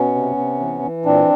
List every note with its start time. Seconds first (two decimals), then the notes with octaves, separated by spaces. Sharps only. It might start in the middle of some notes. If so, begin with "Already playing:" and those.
Already playing: B2 B3 C#4
0.15 C3
0.37 C3
0.60 E3
0.83 E3
1.05 A#2 C4 D4